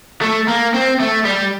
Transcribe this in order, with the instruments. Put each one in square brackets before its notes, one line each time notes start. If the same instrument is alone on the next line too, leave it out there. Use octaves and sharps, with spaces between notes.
[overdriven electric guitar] A3
A#3
C4
A3
G3